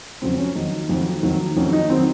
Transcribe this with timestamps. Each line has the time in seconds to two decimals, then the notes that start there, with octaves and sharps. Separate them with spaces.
0.22 F2 C#3 F#3 C4
0.38 C#4
0.55 F2 D#3 F#3 D#4
0.89 F2 D#3 F#3
1.23 F2 D#3 F#3
1.56 F2 D#3 F#3 C#4
1.73 D#4
1.90 D#3 F#3 C4